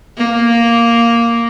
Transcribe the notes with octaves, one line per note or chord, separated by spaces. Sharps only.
A#3